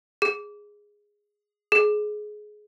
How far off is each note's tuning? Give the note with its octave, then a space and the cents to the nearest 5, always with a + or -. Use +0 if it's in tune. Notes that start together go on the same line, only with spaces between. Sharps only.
G#4 -5
G#4 +20